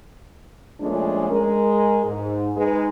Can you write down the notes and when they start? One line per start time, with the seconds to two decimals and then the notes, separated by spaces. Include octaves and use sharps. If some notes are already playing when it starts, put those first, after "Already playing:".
0.80 A#2 F3 G#3 A3 C#4 D4
1.31 G#3 A#4
2.04 G#2
2.56 G#3 D#4 G#4 B4